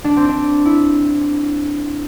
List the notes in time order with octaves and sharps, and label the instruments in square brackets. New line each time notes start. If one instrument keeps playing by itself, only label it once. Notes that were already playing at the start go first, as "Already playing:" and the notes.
[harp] D4
C4
D4
E4